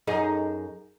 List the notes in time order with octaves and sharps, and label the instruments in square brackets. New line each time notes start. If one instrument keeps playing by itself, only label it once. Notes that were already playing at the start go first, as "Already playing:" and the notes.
[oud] F#2 D#4 G#4